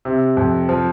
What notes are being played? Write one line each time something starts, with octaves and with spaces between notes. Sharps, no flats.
C3
F2
F3